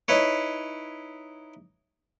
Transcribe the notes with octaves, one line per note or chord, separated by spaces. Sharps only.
D#4 E4 B4 C#5